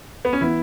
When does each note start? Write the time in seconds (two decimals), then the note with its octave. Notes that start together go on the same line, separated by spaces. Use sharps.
0.25 B3
0.33 C#4
0.41 E3 B3 E4